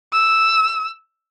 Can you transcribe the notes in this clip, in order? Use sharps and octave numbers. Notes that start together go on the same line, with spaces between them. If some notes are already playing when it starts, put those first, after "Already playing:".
E6